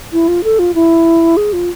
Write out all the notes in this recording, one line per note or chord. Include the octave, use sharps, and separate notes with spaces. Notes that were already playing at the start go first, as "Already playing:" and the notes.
E4
F4
A4
F4
E4
G#4
F4